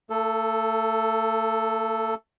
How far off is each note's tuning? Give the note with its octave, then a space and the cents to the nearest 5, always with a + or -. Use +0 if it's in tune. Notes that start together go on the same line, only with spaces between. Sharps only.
A3 +40 A4 +0